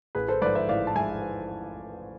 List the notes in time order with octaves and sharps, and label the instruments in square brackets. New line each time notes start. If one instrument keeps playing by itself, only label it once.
[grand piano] A1 G#4 B4
A4 C5
G#2 F3 B4 D5
C5 E5
A1 D5 F5
A5
G#2 F3 E5 G#5